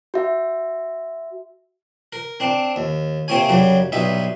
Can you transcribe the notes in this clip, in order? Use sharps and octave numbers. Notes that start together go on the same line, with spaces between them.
F#4 E5
A#4
C4 D4
D#2
C3 A#3 C4 C#5 G#5
F#2 C#3 F#3 G3
B1 G2 D#4 E5